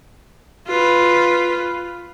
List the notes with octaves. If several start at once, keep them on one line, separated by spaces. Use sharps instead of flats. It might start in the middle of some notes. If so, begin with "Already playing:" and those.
F4 B4